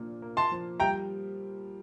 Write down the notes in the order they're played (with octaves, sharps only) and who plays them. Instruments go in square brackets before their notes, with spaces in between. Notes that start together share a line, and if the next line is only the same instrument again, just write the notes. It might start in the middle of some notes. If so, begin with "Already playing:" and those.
Already playing: [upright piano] A#2 F3 A#3 D4
A#3
[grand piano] A5 C6
[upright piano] F3
[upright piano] G3 [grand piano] G5 A#5